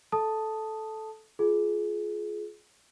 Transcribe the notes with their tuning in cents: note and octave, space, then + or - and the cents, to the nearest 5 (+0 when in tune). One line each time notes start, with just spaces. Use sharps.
A4 -10 A5 +0 D#6 +0
F4 +0 G#4 +25